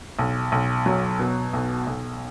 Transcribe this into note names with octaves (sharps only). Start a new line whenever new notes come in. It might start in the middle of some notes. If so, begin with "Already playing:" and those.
B1
B1
F#3
B2
B1
B1